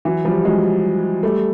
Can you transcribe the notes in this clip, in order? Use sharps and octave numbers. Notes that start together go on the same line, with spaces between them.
E3 F#3
F3 G3
F#3 G#3
G3 A3